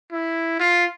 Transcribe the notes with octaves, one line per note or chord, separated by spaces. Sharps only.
E4
F4